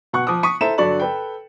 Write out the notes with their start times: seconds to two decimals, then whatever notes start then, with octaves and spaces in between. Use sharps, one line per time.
0.13 B2 F#5 C#6 F#6
0.27 F3 D6 D#6
0.43 C#6 D#6 B6 D#7
0.61 E4 A4 C5 E5 A#5 E7
0.78 G2 D3 F#3 D5 C#6 F#7
0.99 A4 B4 G5